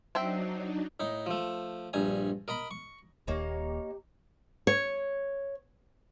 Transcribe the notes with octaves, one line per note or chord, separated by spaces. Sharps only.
F#3 C4 D4 D#4 E5 G5
A2 D#4
F3 A3
A#1 G2 G#5 A#5
A#4 D#5 A#5 B5
C#6
D#1 D#2 D#3 A#3 D#4 G4 C#5
C#5